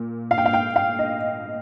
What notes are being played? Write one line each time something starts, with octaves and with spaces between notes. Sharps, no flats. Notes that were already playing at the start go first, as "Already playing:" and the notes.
Already playing: A#2 A#3
F5
G5
F5
G5
F5
D#5